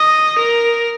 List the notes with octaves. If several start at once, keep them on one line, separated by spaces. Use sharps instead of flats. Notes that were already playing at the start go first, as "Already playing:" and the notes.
Already playing: D#5
A#4